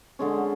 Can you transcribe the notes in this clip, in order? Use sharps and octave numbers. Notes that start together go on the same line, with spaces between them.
D3 G#3 C#4